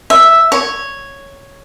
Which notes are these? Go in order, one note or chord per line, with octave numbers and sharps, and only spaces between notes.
E5
C#5